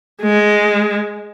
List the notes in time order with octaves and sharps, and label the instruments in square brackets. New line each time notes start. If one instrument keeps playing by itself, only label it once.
[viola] G#3